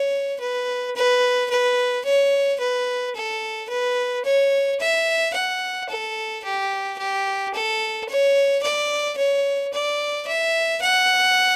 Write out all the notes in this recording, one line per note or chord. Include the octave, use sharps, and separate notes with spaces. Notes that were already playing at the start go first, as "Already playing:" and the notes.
Already playing: C#5
B4
B4
B4
C#5
B4
A4
B4
C#5
E5
F#5
A4
G4
G4
A4
C#5
D5
C#5
D5
E5
F#5